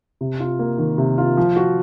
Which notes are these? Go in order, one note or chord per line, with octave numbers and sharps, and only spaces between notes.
C3
F4
A#3
D#3
C3
F4
F3
F#4